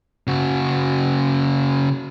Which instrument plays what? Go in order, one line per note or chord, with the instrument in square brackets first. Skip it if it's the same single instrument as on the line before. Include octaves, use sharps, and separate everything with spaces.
[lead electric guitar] C#3 F#4